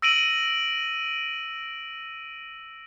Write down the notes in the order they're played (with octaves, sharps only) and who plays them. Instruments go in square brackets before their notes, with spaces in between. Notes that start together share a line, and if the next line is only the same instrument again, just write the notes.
[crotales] E6 A#6 D7 D#7 F#7